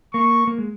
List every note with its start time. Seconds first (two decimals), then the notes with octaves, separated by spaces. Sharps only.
0.14 A#3 C#6
0.47 A#3
0.58 G#3